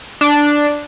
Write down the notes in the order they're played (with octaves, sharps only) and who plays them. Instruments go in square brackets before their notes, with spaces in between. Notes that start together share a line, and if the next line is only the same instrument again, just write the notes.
[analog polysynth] D4